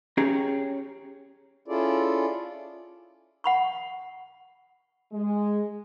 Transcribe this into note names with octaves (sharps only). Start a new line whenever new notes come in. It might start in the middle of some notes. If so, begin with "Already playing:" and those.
C#4 G4 G#4 C#5 A#5
C#4 E4 F4 G#4 A4 D5
F#5 B5 C#6
G#3